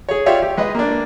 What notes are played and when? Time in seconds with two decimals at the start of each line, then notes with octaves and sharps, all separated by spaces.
0.09 G#4 C#5
0.26 F4 G4 C#5 D5 E5 F5
0.42 G4
0.57 G#3 B4 D#5
0.75 A#3 D4